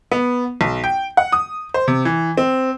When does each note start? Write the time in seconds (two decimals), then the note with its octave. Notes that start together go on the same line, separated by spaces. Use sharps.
0.12 B3
0.61 B1
0.84 G5
1.17 F#5
1.32 D#6
1.74 C5
1.88 C3
2.05 E3
2.37 C4